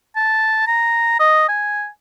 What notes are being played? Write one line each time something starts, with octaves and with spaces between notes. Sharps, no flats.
A5
A#5
D#5
G#5